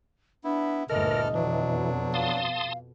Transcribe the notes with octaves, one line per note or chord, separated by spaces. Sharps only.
B3 D4 E4
G1 D2 A#2 E3 A4 A#4 D#5 F6
F2 B2 E3 F#3 D4
F5 A5 C6 D#6